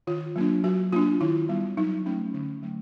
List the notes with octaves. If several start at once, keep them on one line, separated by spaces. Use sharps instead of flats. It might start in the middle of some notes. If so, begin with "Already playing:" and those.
D#3 F4
F#3 A#3 D4
F#3 F#4
A#3 D4 F4
D#3 E4
G3 B3
F#3 D#4
A3 C#4
D3
F#3 A3